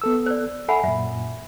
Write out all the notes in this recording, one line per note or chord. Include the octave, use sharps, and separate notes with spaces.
B3 A4 E6
C5 D5
A4 E5 F#5 G#5 B5
F#2 A#2 E5